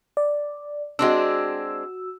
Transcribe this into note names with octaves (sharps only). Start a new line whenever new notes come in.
D5
G#3 C4 D4 F#4 E6